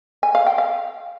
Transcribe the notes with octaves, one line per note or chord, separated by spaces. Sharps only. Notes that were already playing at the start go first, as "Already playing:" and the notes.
G#5
F5
G5
F5